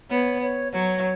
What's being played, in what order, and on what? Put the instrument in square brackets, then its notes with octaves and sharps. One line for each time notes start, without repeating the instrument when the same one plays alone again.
[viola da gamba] B3 [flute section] C#5
[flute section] C#5
[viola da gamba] F#3 [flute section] C#5